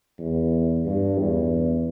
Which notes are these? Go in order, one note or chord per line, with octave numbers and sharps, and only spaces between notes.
E2
G2
E2